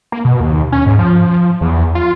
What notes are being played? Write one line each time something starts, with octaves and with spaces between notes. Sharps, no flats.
A#3
B2
D#2
C#4
G#2
F3
E2
F4